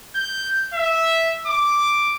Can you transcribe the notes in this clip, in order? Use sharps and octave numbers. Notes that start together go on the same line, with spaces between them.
G6
E5
D6